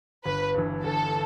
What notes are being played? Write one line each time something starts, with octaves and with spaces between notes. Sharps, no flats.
G1 B4
G2 E3
G1 A4